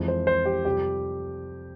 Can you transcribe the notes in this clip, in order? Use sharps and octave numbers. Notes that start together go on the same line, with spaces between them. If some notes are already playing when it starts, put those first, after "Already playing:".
Already playing: F2 E3 G#3
C5
C5
G4
F2 C3 G3 G4